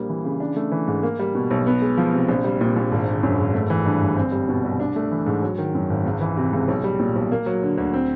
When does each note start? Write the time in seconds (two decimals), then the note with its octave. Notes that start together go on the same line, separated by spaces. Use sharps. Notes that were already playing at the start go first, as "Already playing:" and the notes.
Already playing: A#1 G3 A#3
0.09 E3
0.25 C#3
0.40 D4
0.56 A3
0.72 E3
0.87 G#2
1.03 A#3
1.20 G3
1.35 B2
1.51 B1
1.67 B3
1.82 G#3
1.97 F3
2.13 C3
2.29 A#1
2.44 G3
2.61 A#2
2.76 A#1
2.92 G#1
3.07 D3
3.23 F#2
3.39 G#1
3.54 A3
3.70 E3
3.86 G2
4.02 G1
4.17 C4
4.32 G3
4.49 B2
4.64 C2
4.80 D4
4.96 A3
5.12 E3
5.26 G#2
5.43 F#3
5.58 D#3
5.75 F#2
5.90 G#1
6.06 C#2
6.21 E3
6.37 C3
6.53 C#2
6.68 B1
6.84 G3
7.00 A#2
7.16 B1
7.32 A#3
7.46 F#3
7.63 D3
7.78 D2
7.94 C4